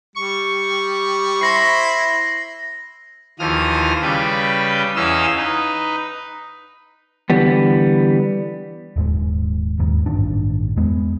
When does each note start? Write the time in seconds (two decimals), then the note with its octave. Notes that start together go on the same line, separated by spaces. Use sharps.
0.16 G3 C#6
1.41 E4 C5 B5 A#6 C7
3.39 D#2 E3 F3 D#6 F6
4.02 C#3 G3 B4 G5
4.96 E2 E3 C#4 D#5 F5 E6
5.37 D#4 B4
7.30 D3 E3 G3 B3
8.96 D#1 G#2
9.79 D#2 G#2
10.06 A1 G2 D#3 D4
10.76 E2 G#3 B3